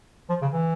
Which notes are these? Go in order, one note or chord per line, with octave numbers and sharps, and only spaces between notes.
F3
C#3
E3